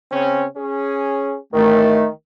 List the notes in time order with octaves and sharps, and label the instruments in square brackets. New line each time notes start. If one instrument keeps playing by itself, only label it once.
[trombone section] C#3 C4 C#4
C#4 G#4
[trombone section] A1 [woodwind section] D#3 A3